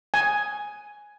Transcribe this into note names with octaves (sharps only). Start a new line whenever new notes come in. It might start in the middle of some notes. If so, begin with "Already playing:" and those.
G#5